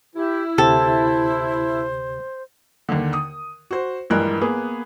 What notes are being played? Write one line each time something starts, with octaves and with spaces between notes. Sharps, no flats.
E4 G4
D2 C3 G4 A4 C5
D#2 D3
D#6
F#4 C5
A#1 G2 E3 G#3 A#4 F#6
A#3 B3 G#4